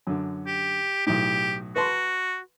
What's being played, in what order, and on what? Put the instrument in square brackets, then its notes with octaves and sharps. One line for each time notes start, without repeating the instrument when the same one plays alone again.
[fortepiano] F#2 D3
[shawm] G4
[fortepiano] B1 A2 [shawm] G4
[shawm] F#4 [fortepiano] B4 A5 C6